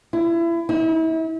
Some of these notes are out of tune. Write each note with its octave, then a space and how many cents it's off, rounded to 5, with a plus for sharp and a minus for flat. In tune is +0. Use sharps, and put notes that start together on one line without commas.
E4 +30
E4 -35